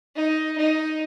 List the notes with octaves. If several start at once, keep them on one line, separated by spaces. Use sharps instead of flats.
D#4
D#4